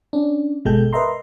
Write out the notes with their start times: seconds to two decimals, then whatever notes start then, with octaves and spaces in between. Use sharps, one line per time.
0.13 C#4 D4
0.65 G1 B2 G#3 A4 G5 G6
0.93 A#4 B4 D#5 E5 A#5 C6